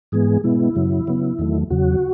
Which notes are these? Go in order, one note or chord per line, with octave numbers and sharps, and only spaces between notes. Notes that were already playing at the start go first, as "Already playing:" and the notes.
G#2 E3 G#3 B3 G#4
B2 G#3 B3 E4
F#2 C#3 F#3
C#3 F#3 B3
E2 D#3 F#3 A3
E2 C#3 F#3 F#4